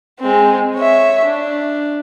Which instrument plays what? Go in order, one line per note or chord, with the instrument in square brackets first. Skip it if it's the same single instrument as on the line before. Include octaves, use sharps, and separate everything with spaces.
[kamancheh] G#3 C4
C#5 E5
D4